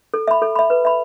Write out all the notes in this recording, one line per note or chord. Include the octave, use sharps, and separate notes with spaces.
A4
E5 B5
A4
E5 B5
B4
E5 B5